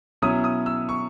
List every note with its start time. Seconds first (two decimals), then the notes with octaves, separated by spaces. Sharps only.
0.22 B2 F#3 C#4 E4 D#6
0.44 D#6
0.66 E6
0.89 C#6